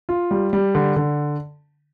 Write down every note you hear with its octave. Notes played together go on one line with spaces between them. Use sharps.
F4
G3
G3
D3
D3